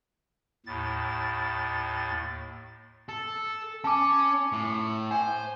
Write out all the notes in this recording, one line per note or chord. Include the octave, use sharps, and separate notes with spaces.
D#2 A2 A6
A4
C#4 A5 D6
A2
C5 G#5